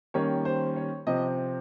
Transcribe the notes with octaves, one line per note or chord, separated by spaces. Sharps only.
D#3 G3 A#3 C#4 C#5
C5
C#5
C3 F3 C4 D#5